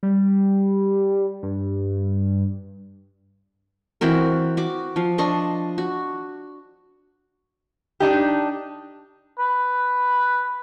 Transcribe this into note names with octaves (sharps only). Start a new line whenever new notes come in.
G3
G2
E3 C4 F#4 A#4
F#4 D6
F3 F5
D4 D#5 C6 C#6
F#4
D4 D#4 G4
B4